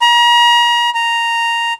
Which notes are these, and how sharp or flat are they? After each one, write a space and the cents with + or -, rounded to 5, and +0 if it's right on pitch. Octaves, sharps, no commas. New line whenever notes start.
A#5 +35
A#5 -5